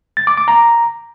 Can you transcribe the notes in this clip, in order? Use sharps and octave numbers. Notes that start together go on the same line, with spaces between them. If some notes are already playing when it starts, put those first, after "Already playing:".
A6
D6
D6
A#5